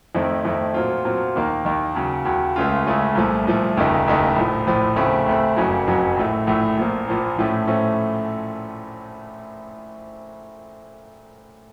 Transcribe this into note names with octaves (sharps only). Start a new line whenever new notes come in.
F2 D#3 A3 C4
F2 D#3 A3 C4
A#2 F#3 C4 F4
A#2 F#3 C4 F4
D#2 D#3 A#3
D#2 D#3 A#3
D#2 C#3 F#3
D#2 C#3 F#3
C#2 C#3 A3 C#4 F4
C#2 C#3 A3 C#4 F4
C2 A#2 F3 A3
C2 A#2 F3 A3
F1 D#2 C#3 A3 D#4
F1 D#2 C#3 A3 D#4
A#1 A2 F3
A#1 A2 F3
D#2 C#3 A3 C4
D#2 C#3 A3 C4
F#1 F2 C#3 F#3
F#1 F2 C#3 F#3
A#1 A2 A3
A#1 A2 A3
A#1 A#2 F3 A#3
A#1 A#2 F3 A#3
A#1 A2 F3 A3 C#4
A2 F3 A3 C#4